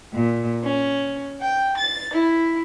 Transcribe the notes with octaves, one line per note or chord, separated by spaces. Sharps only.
A#2
C#4
G5
A6
E4